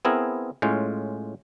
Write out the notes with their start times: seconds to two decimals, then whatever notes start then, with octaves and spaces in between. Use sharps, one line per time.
0.05 B3 C4 E4 G#4 A#4
0.62 A2 G#3 C#4 F4